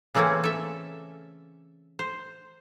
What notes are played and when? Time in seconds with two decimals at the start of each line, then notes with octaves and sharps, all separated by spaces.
0.14 C#3 E3 A3 A#3 C4 C#4
0.44 A4 E5
1.99 C5